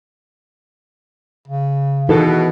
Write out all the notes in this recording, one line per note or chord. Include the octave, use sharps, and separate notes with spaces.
C#3
B2 D#3 E3 G#4 A4 B4